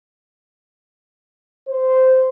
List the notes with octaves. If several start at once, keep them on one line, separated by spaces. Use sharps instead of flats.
C5